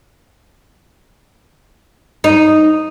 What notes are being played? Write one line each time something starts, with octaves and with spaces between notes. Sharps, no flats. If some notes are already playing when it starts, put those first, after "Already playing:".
D#4